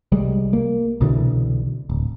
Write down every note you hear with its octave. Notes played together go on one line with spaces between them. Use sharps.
C2 G3 G#3
A#3
C2 B2 D3 E3
D1